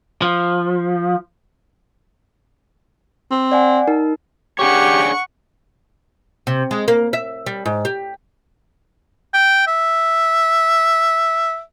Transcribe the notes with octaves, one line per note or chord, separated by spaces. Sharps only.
F3
C4
D5 F#5 G#5
D#4 A#4
D4 G4 G#4 C#5 F#5 C#6
C3
G#3
A#3
E5
G3
G#2
G4
G5
E5